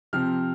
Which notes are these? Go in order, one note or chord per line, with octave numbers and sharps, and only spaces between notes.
C3 F3 C4 F6